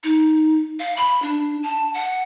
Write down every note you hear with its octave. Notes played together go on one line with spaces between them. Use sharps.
D#4
F5
B5
D4
A5
F#5